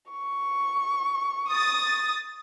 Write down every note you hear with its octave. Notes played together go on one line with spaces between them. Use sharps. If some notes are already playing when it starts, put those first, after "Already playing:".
C#6
D#6 A6